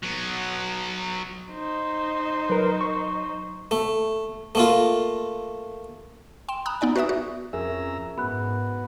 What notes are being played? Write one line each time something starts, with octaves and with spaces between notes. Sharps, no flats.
F#3 B3
D#4 C5
F#3 A#4 B4
C#6
A3
A3 A#3 F4
G5 C6 E7
A#5 B5 D#6 F#6
B3 D#4 D5 G#5
F#4 B4 D5 E5 D#6
F#4
F2 C#4 G#4 A#4 E5 A#5 E6
G#2 B3 F#4 B5 F#6